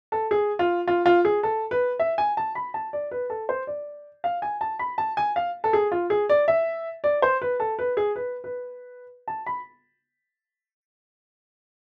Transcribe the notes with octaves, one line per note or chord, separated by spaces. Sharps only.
A4
G#4
F4
F4
F4
G#4
A4
B4
E5
G#5
A5
B5
A5
D5
B4
A4
C5
D5
F5
G#5
A5
B5
A5
G#5
F5
A4
G#4
F4
G#4
D5
E5
D5
C5
B4
A4
B4
G#4
B4
B4
A5
B5